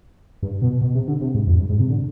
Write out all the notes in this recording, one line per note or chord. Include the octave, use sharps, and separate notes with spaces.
G2
B2
B2
C3
D3
C3
G#2
F2
G2
G#2
C3
D3